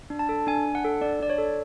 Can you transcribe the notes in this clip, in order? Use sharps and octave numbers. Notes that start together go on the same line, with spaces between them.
D4
A5
A4
D4 G#5
D4
F#5
A4
D4 D5
D4 D5
C#5
A4